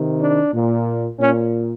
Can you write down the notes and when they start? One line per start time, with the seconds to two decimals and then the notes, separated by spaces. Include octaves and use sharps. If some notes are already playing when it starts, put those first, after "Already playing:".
Already playing: C3 D#3
0.20 D4
0.54 A#2
1.19 A#2 C#4